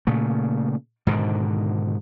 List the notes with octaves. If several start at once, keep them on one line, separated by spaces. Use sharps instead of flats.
A#2 C#3 A3
G#2 B2 D3 D#3